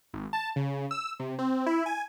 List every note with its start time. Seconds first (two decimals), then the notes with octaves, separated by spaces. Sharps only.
0.14 G#1
0.33 A5
0.56 C#3
0.91 E6
1.20 C3
1.39 C4
1.66 E4
1.86 G#5